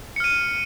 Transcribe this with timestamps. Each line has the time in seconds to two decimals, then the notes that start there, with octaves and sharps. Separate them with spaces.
0.16 C#7
0.20 F6
0.24 D#7